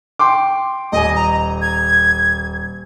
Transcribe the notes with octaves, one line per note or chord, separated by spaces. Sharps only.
G5 C6 D6
D#1 D#5 G#5
A#5
G#6